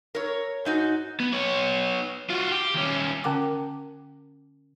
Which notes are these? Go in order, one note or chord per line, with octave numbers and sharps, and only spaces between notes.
A#4 C#5
G#2 D#4 F#4
B3
B3 C#5
F4 F#4
G4
D#2 C#4
D3 C#4 A#4 F#5 G5 D6